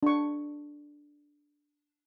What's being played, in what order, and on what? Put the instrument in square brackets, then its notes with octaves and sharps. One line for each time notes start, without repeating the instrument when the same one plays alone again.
[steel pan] D4 C#6